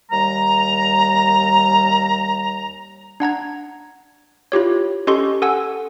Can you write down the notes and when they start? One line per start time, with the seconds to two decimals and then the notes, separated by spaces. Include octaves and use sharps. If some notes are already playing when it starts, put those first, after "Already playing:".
0.11 D#2 G3 A#5
3.20 D4 F#5 A#5 G#6
4.52 E4 F4 G4 C#5
5.07 C#4 G4 A4 D#5 C6 C#6
5.42 A4 F#5 G#5 E6